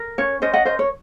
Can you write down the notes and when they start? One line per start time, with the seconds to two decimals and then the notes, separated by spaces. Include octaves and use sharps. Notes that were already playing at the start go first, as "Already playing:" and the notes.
Already playing: A#4
0.18 C#4 C#5
0.42 C#4 C5 D#5
0.53 D#5 F#5
0.65 A#4 C5 D#5
0.79 C#5